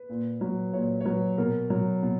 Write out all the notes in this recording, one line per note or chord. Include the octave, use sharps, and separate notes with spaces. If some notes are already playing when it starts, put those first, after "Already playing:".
Already playing: B4
A#2
F#3
A#2 C#5
C#5
F#3 B4
B2 A#4
F#3
B2